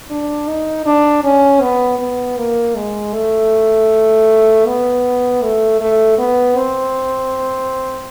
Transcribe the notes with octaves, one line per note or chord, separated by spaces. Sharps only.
D4
D#4
D4
C#4
B3
B3
A#3
G#3
A3
B3
A3
A3
B3
C4